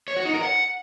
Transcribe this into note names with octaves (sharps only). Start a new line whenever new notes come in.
C#5
F#4
D#4
A#4
F#5